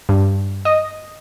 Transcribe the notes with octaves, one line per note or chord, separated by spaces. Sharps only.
G2
D#5